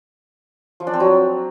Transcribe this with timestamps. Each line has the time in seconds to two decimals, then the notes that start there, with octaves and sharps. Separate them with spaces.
0.80 F3
0.87 D4
0.93 C4
1.00 F#3